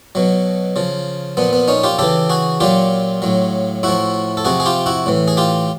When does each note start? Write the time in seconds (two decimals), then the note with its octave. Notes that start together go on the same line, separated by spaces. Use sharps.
0.15 B2 F#3
0.76 C#3 F3
1.37 A#2 F3 B3
1.53 B3
1.68 C#4 D#4
1.83 F4 G4
1.98 C#3 E3 G4 A4
2.30 F#4 G#4
2.60 A#2 F#3 F4 G4
3.22 A2 F#3
3.83 A2 F3 E4 F#4
4.37 A4
4.45 C3 F3 F#4 G#4
4.60 G#4
4.66 F4 G4
4.86 E4 F#4
5.06 A2 E3
5.28 G#4
5.37 F4 G4